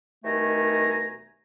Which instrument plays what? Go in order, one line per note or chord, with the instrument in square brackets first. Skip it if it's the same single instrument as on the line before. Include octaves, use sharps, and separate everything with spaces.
[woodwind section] C2 B2 D#3 A3 G#5 A#5